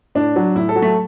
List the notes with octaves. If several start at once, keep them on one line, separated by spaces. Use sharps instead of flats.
A2 D4
F#3
A2 E4
A4
F#3
A3